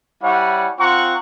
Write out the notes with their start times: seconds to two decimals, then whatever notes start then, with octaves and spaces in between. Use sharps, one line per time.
0.22 G3 E4 C#5 F#5 G#5
0.79 C4 F4 F#5 A#5 C#6